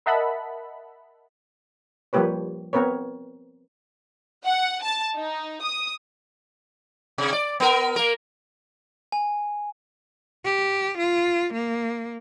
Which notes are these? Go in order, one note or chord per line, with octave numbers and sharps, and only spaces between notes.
A#4 D#5 E5 F#5 A5 B5
F3 G3 A#3 G4 B4 C#5
B3 C4 A#4 B4 C#5
F#5
A5
D#4
D#6
C3
D5
B3 A#4
A#3 A#4
G#5
G4
F4
A#3